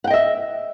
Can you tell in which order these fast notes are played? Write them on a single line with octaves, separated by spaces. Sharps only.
F#5 G5 D#5 E5